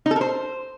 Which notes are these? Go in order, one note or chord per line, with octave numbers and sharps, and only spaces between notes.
D#4
A4
A#4
C5